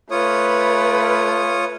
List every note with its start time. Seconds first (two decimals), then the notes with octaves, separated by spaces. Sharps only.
0.11 A3 F4 B4 C#5 D#6